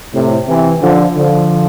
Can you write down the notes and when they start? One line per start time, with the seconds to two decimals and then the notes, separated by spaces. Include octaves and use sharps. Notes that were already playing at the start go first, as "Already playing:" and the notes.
0.13 A2 C3
0.48 C3 E3
0.82 D3 F3
1.17 D3 F3